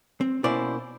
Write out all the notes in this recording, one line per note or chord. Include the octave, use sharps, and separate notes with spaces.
C4
B2 A#3 C#4 E4 C5 D5